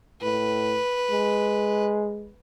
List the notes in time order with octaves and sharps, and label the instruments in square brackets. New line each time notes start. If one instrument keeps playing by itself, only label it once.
[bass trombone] A2 [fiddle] B4
[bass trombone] G#3